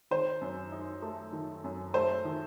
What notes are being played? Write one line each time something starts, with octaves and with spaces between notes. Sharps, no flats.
D#3 C5
F#2
D#4
A3
D#3
F#2
A3 C5
D#3